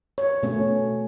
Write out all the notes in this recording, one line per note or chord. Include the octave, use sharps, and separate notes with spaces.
C#5
B2 A3 C#4